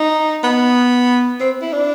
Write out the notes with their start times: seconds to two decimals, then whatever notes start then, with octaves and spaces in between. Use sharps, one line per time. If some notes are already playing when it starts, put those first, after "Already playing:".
Already playing: D#4
0.43 B3
1.40 C4
1.62 E4
1.73 D4